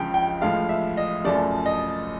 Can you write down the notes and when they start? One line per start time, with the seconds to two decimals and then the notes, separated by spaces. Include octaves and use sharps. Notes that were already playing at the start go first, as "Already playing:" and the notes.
Already playing: C#2 C#3 F3 G5
0.14 G5
0.41 A2 F3 G#3 F5
0.69 E5
0.97 D#5
1.25 F#2 C#3 F3 A3 D5
1.66 D#5